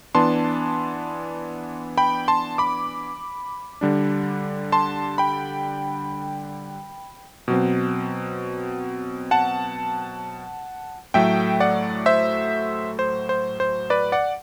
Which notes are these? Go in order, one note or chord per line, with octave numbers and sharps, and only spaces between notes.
E3 B3 D4 A5 C6
G5 B5
A5 C6
B5 D6
D3 G3 D4
A5 C6
G5 B5
B2 F#3 C4
F#5 A5
A2 F#3 A3 E5 G5
D5 F#5
C5 E5
C5
C5
C5
B4 D5
D5 F#5